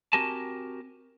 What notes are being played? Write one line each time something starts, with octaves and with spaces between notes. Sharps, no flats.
C4 F#4 G4 A#4 G#5 A5